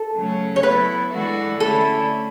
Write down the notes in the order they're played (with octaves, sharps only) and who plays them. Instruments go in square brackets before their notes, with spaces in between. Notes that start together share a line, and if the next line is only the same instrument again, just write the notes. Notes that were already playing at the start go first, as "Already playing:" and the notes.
Already playing: [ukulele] A4
[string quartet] C#3 F#3 A3 C#4
[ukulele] C#5
[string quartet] F#3 B3 E4 A4 [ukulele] B4
[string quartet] E3 G#3 D4 F#4 A4
[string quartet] D3 A3 C#4 E4 [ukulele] A4